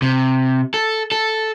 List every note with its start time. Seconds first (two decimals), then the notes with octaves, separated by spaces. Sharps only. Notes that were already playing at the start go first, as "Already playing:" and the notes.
0.02 C3
0.74 A4
1.12 A4